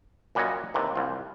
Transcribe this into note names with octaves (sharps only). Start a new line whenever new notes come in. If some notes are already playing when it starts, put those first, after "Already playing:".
F#2 A#2 G3 F#4 C#5 D#5
D#2 C3 E3
C2 F4